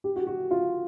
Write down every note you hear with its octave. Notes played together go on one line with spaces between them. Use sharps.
G4
F#4
F#4
F4